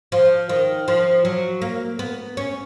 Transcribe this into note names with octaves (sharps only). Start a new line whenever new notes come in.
F3
D#3
F3
F#3
A#3
B3
C#4